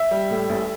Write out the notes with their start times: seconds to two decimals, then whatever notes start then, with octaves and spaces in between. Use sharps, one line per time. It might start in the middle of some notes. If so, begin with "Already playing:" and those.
Already playing: E5
0.11 G3
0.31 A2
0.49 A1